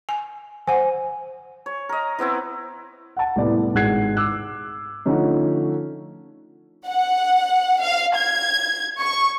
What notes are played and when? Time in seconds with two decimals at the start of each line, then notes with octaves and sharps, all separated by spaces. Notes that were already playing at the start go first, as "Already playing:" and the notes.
0.09 G#5
0.67 C5 F#5 G#5
1.66 C#5
1.89 A#4 D#5
2.19 E3 B3 C4 E4
3.17 F#5 A5
3.36 C2 A2 B3 D5
3.74 G#1 G#3 F#5 F#6 G#6 C7
4.17 D6 E6 F#6
5.05 D3 F3 A3 C#4 D#4
6.88 F#5
7.82 F5
8.16 G#6
8.99 C#6